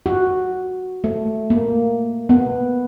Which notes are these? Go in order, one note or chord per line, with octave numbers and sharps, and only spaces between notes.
F#4
A3
A#3
B3